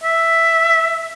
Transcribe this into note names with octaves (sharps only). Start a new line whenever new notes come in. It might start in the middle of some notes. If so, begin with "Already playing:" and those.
E5